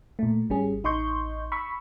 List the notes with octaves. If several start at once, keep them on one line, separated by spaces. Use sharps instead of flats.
A#2 A3
G#1 G3 C#4 G#4
A1 D#4 D#5 C6 C#6 G6
B5 C#6 E6